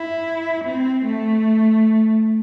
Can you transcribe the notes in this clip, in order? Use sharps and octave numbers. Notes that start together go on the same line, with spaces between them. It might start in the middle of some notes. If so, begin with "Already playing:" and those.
Already playing: E4
C4
A3